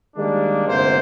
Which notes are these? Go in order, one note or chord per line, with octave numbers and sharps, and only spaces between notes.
D#3 G3 G#3 A#3 D4
G1 G#2 C3 A#3 C5